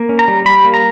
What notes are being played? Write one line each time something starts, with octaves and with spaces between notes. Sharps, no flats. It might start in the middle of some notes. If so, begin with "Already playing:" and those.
Already playing: A#3
C#4
A#5
G3
G3 B5
A#3
A#5